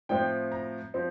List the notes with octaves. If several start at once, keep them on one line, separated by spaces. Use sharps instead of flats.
A2 F3 C4 G5
A#5
F3 C4